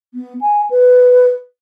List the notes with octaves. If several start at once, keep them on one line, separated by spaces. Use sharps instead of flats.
B3
G#5
B4